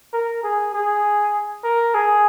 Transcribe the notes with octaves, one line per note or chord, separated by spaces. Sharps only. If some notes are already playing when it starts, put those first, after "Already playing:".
A#4
G#4
G#4
A#4
G#4